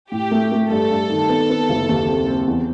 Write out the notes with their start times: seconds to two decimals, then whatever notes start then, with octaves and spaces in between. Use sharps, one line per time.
0.12 A2 G4
0.31 A3
0.52 A3
0.70 G2 A4
0.90 G2
1.09 D#3
1.29 B3
1.50 B3
1.69 F#1
1.89 D#2
2.07 C4
2.27 C4
2.47 E2